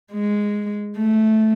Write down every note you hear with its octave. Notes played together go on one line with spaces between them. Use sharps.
G#3
A3